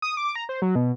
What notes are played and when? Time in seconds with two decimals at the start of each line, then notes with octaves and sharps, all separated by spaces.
0.02 D#6
0.17 D6
0.36 A#5
0.49 C5
0.62 F#3
0.75 B2